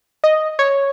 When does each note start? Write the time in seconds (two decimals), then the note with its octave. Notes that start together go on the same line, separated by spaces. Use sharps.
0.24 D#5
0.59 C#5